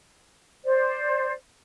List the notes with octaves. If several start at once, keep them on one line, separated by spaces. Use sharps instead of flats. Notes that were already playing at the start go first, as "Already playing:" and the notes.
C5 D5